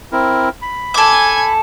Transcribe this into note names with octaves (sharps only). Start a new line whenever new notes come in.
C4 E4 A#4
B5
A4 G#5 D6 G#6